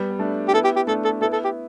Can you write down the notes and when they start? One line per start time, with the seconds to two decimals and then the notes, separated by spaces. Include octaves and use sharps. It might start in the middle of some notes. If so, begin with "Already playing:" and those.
Already playing: G3 B3
0.10 B3
0.19 A3 D4
0.48 G4
0.53 B3 E4 A4
0.64 G4
0.76 G4
0.87 A3 D4 A4
1.04 A4
1.21 B3 E4 A4
1.33 A4
1.44 G4